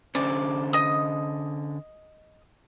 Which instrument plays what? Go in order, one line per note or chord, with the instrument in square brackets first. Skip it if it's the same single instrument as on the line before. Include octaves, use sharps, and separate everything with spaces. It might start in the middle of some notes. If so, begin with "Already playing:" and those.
[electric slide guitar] D3 C#4 C5 [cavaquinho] D5
[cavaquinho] D#5 D#6